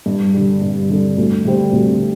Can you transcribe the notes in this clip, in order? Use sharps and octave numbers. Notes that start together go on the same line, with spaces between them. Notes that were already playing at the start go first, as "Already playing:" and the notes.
G2
D3 G3
G2
D3 G3
D2
D3 G3 C4
D2